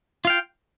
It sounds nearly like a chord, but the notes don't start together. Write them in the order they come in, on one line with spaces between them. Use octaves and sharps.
F4 F5 G5